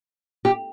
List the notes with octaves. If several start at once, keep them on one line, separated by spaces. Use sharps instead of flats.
G4